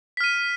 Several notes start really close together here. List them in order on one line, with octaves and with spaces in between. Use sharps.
B6 F6 D#7